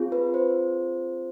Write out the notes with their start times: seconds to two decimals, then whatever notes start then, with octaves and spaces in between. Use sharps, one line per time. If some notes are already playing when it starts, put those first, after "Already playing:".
Already playing: C4 F4 G#4
0.12 B4
0.34 C5